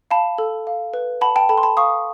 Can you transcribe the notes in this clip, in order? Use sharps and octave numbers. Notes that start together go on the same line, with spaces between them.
F5 A5 B5
A4
F5
B4
F#5 A5 B5
G5 A5
A4 A5 B5
C6
A5 B5
F5 C#6 D#6